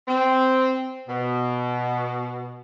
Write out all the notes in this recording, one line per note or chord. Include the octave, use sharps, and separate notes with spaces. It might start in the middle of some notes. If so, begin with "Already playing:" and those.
C4
B2